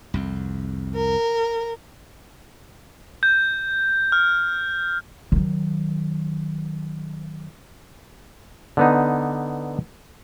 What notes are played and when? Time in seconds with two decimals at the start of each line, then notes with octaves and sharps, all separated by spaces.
0.14 C2 F2
0.96 A#4
3.23 G6
4.12 F6
5.32 D#3 F#3
8.77 D3 B3 D#4